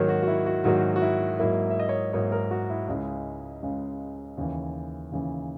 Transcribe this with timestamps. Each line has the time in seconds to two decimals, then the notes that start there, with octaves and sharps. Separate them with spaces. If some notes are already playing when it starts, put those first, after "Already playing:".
Already playing: G#2 D#3 F#3 A#3 C#5
0.08 F#4
0.23 F#4
0.27 E4
0.46 F#4
0.64 G#2 D#3 F#3 A#3 F#4
0.96 F#4
1.02 E4
1.39 G#2 F#3 A#3 E4
1.70 E5
1.79 D#5
1.89 C#5
2.13 G#2 F#3 A#3 C#5
2.32 A#4
2.51 F#4
2.70 E4
2.88 C#2 C#3 G#3 E4
3.63 C#2 C#3 G#3
4.37 D#2 C#3 E3
5.12 D#2 C#3 E3